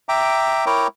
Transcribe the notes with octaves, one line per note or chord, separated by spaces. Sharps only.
E5 G5 A#5 D6
E4 A#4 C#5 G5 A#5 D6